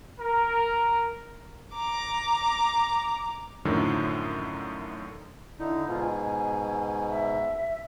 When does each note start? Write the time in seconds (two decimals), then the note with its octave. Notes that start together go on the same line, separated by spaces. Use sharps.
0.19 A#4
1.75 A#5 D6
3.65 F#2 A2 D3 D#3 F3 F#3
5.59 D3 D#4 E4
5.87 G#2 B2 F4
6.00 G#5
7.10 E5